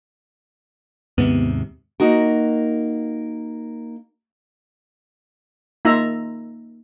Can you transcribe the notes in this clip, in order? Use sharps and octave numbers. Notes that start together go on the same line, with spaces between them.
D#2 G#2 C3 B3
A#3 D#4 F#4 A#4
A#3 D#4 F4 E5 A#5